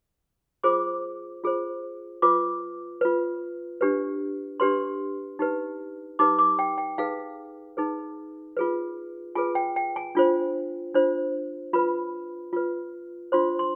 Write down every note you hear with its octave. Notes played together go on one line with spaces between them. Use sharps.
F4 G#4 C5 D6
F4 G#4 C5
F4 B4 D6
F4 B4
D4 G4 B4
D4 G4 B4 C6
D#4 G4 B4
D#4 G4 B4 D6
D6
G5
G5
D#4 G#4 B4 F5
D#4 G#4 B4
F4 G#4 B4
F4 G#4 B4 G#5
G5
G5
G#5
D4 F4 C5
D4 F4 C5
F4 B4 B5
F4 B4
D4 F4 C5 C6
C6